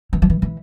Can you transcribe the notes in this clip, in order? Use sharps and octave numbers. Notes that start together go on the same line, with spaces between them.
E3
F3
E3
E3